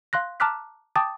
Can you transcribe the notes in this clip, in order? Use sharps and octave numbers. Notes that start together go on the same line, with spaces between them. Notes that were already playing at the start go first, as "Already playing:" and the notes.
F5 C6 F#6 A#6
A5 A#5 D6 F6 F#6 B6
G5 A5 D6 D#6 A6